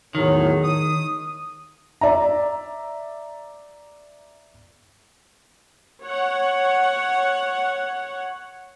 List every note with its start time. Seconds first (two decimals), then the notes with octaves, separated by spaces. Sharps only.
0.15 E2 A2 D#3 F#3
0.63 D#6
2.01 D5 E5 A#5
6.02 C#5 F#5